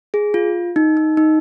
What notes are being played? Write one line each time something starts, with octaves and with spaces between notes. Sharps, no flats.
G#4
F4
D#4
D#4
D#4